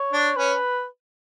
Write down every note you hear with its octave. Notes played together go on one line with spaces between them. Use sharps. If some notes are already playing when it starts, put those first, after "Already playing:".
Already playing: C#5
D4
C#4 B4